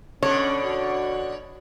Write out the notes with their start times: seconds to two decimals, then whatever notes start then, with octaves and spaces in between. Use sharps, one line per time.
0.23 B2 D3 C#4 D4 C#5
0.65 F#4